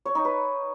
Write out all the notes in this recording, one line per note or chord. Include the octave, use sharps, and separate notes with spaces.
C#5
D#4
B4